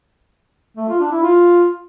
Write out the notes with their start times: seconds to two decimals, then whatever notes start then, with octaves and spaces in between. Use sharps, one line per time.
0.77 A3
0.88 F4
1.00 D4
1.12 E4
1.23 F4